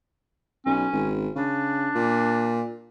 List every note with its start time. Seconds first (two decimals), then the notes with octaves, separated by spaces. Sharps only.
0.66 B1 C#4
0.93 G#1
1.35 C#3 D4
1.95 A#2